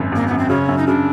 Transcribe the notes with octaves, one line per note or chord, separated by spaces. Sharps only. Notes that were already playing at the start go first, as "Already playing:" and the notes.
Already playing: G#1 F#2
G#1 A#3
F#2 B3
C4
C#3 C#4
F#2
D#4
C#3 D4